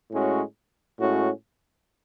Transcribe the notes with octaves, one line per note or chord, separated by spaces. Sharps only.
A2 G#3 C#4 F#4
A2 G#3 C#4 F#4